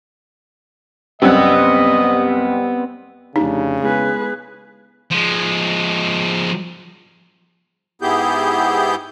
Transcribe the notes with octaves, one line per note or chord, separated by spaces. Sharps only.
C2 F#2 G3 B3 C4 D#5 F#5 E6
F1 C#3 D4 D#4 G4
G#3 B3 E4 G#4 B4
F3 G#3
G#2 B3 E4 G4 G#4 G6